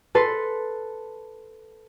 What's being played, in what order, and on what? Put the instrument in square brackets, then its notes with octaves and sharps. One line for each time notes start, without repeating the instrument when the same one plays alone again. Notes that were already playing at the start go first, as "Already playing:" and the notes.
[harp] A4 B4 C6